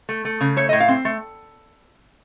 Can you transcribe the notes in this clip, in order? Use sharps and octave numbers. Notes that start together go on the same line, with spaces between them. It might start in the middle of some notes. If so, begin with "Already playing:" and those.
A3
A3
C#3
A3 C#5
D#5
A2
F5
C4
A3